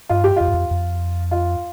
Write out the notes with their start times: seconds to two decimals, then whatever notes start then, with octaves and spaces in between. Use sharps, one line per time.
0.09 G2 F4
0.24 G4
0.36 F2 F4
0.48 G2
0.54 F2
0.71 F2
1.31 F4